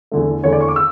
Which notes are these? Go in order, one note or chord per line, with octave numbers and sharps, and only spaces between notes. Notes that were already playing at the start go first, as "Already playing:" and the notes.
E2 D3 A3
E2 D3 A3 C#5
D5
C#6
D6
E6